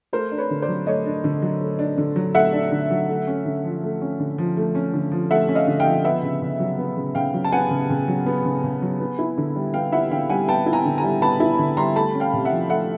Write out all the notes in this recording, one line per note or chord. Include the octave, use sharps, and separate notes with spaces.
A3 A#4 C5
D4
B4 C#5
D3
C5 D5
F#3
A3 C#5 D#5
D4
D3
F#3
A3
D4
D3
F#3
A3 E5 F#5
D4
D3
F#3
A3
C#4
D3
F3
A3
C#4
D3
F3
A3
C#4
D3
F3
A3 E5 F#5
C#4
D#5 F5
D3
F5 G5
F3
B3 E5 F#5
C#3
C#3
F#3
B3
C#3
C#3 F5 G5
F#3
A5
B3 F#5 G#5
C#3
C#3
F#3
B3
C#3
C#3
F#3
B3
E4
D3
G3
B3 F5 G5
E4 E5 F#5
D3 F5 G5
G3 F#5 G#5
B3 G5 A5
E4
G#5 A#5
D3
G#5 A#5
G3
B3 A5 B5
E4
D3
G3 A#5 C6
A3 A5 B5
C#4
F5 G5
C3
E5 F#5
F3
A3 E5 F#5